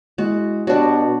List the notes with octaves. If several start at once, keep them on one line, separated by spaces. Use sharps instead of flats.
G#3 E4 F#4
B2 D4 F#4 G4 C#5